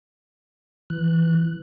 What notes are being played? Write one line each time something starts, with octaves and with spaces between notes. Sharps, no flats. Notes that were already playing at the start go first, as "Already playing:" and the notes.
E3 F#6